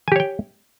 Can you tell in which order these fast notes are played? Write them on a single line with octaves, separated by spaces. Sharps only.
G#5 G4 C#5 G5